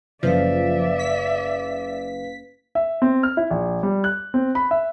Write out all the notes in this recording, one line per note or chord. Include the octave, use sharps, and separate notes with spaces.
F#1 F3 B4 D5 E5 F5
B6
E5
C4
F6
E4
A#1
G3
F#6
C4
B5
E5